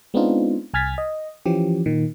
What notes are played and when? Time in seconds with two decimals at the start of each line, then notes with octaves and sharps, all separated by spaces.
0.14 G#3 B3 C4 D4 D#4 F4
0.74 C2 G#5 F6 G#6 A6 B6
0.98 D#5
1.46 E3 F3 C#4 G4
1.86 A#2 D#3